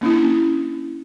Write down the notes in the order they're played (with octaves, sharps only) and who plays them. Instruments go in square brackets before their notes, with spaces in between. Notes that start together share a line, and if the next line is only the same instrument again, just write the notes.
[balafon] A#3 C#4 D4 E4